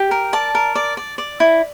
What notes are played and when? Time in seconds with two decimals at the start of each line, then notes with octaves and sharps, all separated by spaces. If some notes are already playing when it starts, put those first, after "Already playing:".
Already playing: G4
0.11 A#4
0.33 D5 A5
0.55 A#4
0.75 D5
0.97 D5
1.18 D5
1.40 E4